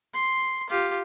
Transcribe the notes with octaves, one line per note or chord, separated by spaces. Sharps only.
C6
F4 G4